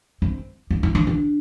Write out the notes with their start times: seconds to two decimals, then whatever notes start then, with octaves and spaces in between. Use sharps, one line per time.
0.22 C4
0.71 B3
0.83 D#4
0.95 D4
1.07 D4